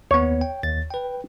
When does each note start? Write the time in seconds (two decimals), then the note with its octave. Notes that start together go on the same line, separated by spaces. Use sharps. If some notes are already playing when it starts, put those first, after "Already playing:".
0.11 D#2 B3 C#5
0.41 G5
0.63 D#2 A6
0.90 B4 G5